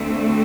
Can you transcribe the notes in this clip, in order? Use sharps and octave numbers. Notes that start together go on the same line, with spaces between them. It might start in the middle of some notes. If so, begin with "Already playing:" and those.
Already playing: D2 D3 A3 C4